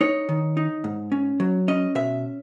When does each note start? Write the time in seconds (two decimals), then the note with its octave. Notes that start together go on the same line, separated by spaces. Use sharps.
0.01 D#4 C#5
0.29 D#3
0.57 D#4
0.84 G#2
1.12 C#4
1.40 F#3
1.68 C#4 D#5
1.95 B2 E5